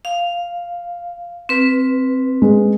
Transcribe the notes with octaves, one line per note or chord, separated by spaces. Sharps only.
F5
C4 B4
G#3